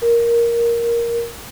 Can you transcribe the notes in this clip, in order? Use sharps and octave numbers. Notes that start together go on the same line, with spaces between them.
A#4